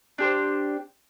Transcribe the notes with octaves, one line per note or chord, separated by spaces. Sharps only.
D4 G4 C5